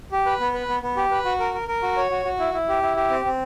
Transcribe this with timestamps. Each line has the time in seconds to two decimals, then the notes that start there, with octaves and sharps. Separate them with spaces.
0.12 G4
0.26 B4
0.40 B3
0.54 B4
0.69 B3
0.83 B3
0.96 G4
1.11 B4
1.25 F#4
1.40 A#4
1.54 A#4
1.68 A#4
1.83 F#4
1.97 C#5
2.11 F#4
2.25 F#4
2.39 E4
2.54 E4
2.69 G4
2.82 E4
2.96 G4
3.10 C4
3.25 C4